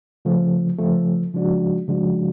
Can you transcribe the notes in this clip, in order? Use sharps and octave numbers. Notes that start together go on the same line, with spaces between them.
C#3 F3 A3
C#3 F3 A3
C#3 F3 G#3 D4 F#4
C#3 F3 G#3 D4 F#4